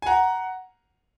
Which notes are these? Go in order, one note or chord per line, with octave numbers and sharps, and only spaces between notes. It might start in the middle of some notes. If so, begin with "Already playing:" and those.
G#5
F#5 A#5